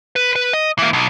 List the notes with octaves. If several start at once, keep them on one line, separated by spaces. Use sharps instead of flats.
B4
B4
D#5
E3 A#3
B1